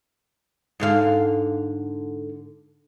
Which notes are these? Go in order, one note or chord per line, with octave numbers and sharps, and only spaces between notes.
G#2 D3 F5